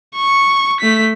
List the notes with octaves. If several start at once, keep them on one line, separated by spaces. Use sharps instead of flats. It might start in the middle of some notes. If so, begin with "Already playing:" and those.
C#6
A3 B6